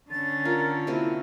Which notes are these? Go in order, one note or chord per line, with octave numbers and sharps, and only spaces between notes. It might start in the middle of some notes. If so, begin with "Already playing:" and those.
D3 C#4 A6
F4 A#4
C3 A#3 E4 F#4